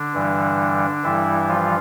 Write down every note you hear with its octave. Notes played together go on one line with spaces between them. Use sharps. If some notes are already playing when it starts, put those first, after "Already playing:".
Already playing: D3 D4
G2 E3 G3
G2 E3 G3 E4
F3 F4